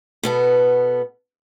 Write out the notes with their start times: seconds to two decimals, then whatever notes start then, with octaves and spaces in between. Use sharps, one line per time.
0.23 B2 B3 A4